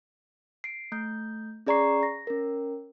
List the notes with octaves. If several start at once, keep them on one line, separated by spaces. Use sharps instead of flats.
C7 D7
A3 G6
C#4 G#4 D5 A#5 C#6 C7
A#6
C#4 A#4